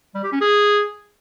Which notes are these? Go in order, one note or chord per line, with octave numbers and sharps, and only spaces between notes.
G3
G4
C#4
G#4